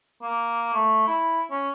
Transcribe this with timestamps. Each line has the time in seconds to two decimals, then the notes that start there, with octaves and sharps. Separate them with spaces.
0.22 A#3
0.74 A3
1.07 E4
1.51 C#4